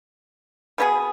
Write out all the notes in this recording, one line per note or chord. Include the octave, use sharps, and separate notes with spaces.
B2 B3 D#4 G#4